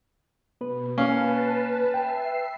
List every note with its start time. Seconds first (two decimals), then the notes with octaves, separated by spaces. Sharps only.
0.61 B2 B3 B4
0.98 A#3 C#4 B4 F5 A5
1.94 E5 G5 C7